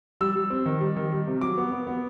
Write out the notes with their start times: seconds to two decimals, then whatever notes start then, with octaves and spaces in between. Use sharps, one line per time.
0.21 G3 E6
0.36 G3
0.50 C4
0.66 D#3
0.81 G3
0.96 D#3
1.12 G3
1.27 C3
1.41 F#3 D6
1.58 B3
1.72 B3
1.87 B3